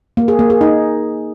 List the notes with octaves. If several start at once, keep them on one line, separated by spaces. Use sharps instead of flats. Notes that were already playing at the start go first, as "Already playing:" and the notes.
A#3
G#4
A#3
G#4
D#4